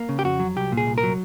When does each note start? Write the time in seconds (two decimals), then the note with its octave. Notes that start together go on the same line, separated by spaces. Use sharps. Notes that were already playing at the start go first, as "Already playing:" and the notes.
Already playing: A#3
0.09 C#3
0.19 G4
0.24 F2 F#4
0.40 F#3
0.56 C2 G4
0.72 A#2
0.77 G#4
0.87 C2
0.98 A#4
1.03 F#3